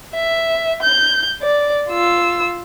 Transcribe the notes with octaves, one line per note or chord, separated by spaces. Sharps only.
E5
G6
D5
F4 E6